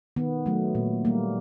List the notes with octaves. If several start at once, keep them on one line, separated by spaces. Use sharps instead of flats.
D#3 B3
F#3 A3
A#2
G3 A#3